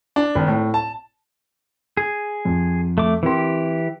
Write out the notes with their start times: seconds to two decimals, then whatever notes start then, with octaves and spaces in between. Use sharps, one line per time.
0.16 D4
0.35 G#1
0.48 A2
0.74 A5
1.97 G#4
2.45 F2
2.98 A3 D6
3.23 E3 C4 G4 A#4 C6